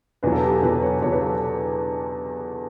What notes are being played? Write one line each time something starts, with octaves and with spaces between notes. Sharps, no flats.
E2 B2 F#3 B4
A4
G4
A4
E2 B2 F#3 B4
C#5
E2 B2 F#3 C#5
B4
A4